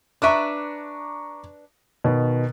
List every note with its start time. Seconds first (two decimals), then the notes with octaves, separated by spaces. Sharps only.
0.22 D4 B4 E5 A#5 C#6 D6
2.04 B2 D#3 B3